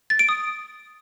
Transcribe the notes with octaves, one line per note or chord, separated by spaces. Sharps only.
A6
D7
D#6